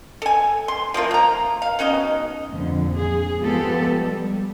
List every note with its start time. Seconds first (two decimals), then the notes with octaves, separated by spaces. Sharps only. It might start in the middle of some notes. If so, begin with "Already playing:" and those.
0.22 A4 G#5
0.68 C6
0.94 F3 A3 A#3 F4
1.11 A#3 A#5
1.62 F5
1.79 B2 C#4 D#4 D#5
2.49 F2 A#2 D3
2.96 G#4
3.40 F3 G#3 B3 F4 G4 A4
4.01 G3